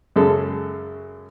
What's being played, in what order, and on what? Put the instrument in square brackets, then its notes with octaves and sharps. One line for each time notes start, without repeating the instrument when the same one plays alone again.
[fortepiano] F#2 C#3 G#3 A4